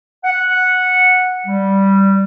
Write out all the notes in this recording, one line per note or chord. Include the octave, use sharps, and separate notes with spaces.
F#5
G3